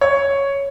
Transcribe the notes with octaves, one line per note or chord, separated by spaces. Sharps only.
C#5